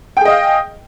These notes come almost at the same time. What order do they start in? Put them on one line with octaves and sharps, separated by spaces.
G5 G#4 D#5 F5